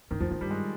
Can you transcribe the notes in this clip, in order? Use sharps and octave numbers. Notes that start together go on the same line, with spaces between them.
G2 D#3
F2 F3
G2 F3
G2 G3
G#3